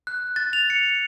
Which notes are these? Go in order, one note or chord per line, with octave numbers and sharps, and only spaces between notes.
F#6
A6
F7
C#7